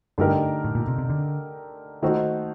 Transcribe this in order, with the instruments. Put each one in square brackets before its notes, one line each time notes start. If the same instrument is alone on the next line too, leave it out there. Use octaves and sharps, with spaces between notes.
[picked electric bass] G2 [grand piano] D3 A3 D#4 G4 A#4
[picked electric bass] A2
A#2
C3
C3
D3
[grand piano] D#3 A3 D#4 F#4 C5